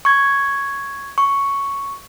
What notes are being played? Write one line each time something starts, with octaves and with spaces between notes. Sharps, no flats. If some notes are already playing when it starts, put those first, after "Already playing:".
C#6 G#6
C#6